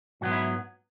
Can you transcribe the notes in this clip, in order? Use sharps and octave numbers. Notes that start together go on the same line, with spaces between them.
G#2 F#3 B3 F#4
E4